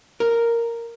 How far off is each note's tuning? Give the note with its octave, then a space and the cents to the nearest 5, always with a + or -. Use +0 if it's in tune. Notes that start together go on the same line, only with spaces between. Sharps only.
A#4 -5